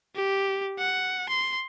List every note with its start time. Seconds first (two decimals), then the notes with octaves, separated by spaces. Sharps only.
0.16 G4
0.79 F#5
1.29 C6